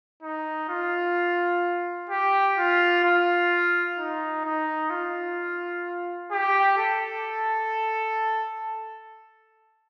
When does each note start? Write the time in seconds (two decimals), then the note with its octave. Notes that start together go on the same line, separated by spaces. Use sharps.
0.23 D#4
0.69 F4
2.09 G4
2.57 F4
3.04 F4
3.98 D#4
4.44 D#4
4.90 F4
6.32 G4
6.77 A4